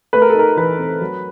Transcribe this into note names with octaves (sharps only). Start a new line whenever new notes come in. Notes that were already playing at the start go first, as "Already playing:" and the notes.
A3 B4
A#4
A4
D#4 A#4
E3 B4
C4
F#3